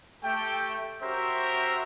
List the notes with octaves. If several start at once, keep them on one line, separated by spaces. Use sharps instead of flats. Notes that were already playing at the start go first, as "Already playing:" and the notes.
A3 G4 G5
C#4 F#4 G4 A#4 C5 E5